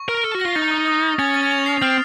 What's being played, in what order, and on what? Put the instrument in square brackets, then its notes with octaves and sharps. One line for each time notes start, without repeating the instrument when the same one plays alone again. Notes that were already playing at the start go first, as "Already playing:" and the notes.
Already playing: [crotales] C#6
[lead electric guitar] A#4 [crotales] F6
[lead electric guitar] A4 [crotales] F6
[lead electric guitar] F#4
[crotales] A#6
[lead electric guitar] F4
[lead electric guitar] D#4 [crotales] A6
[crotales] D#6
D#6
D#6
[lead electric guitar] C#4 [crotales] A6
[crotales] A6
F7
C7
[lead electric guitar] C4 [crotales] F6